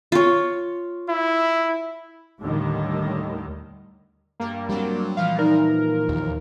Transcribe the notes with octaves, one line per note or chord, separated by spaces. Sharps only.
F4 C#5
E4
D#2 A2 D3 D#3 G3
G2 G3 A#3
F#3 G3 C4 D4
A#2 E3 F3 F5
D#4 A#4 D5
D#2